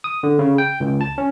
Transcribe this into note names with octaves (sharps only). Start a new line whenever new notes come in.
D#6
D3
C#3
G5
C#2
A5
C#4